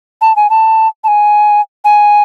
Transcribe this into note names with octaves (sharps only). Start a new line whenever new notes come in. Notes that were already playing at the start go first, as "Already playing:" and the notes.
A5
G#5
A5
A5
G#5
G#5